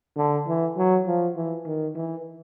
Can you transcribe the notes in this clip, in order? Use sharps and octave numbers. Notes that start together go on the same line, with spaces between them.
D3
E3
F#3
F3
E3
D#3
E3